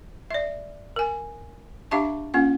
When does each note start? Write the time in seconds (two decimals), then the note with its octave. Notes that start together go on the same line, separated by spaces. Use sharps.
0.31 D5 E5
0.96 A#4 G#5
1.91 D4 G4 E5 F5 A5 C#6
2.34 A#3 C#4 F4 F#5